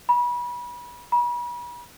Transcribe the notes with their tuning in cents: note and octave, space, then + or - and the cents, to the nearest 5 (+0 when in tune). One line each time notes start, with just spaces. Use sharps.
B5 -30
B5 -40